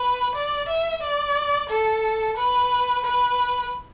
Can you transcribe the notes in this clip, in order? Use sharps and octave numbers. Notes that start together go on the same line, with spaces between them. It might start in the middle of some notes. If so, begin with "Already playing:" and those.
Already playing: B4
D5
E5
D5
A4
B4
B4